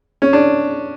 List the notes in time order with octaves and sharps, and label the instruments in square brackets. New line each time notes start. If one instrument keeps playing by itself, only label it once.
[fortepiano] C#4
D4